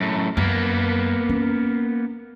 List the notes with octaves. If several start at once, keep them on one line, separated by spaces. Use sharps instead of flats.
F#2 A2
F#2 A#3 B3
C#4